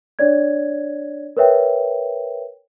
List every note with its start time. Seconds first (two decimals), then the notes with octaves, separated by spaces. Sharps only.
0.19 D4 C#5 D5 G#6
1.37 A#4 B4 C#5 E5 G5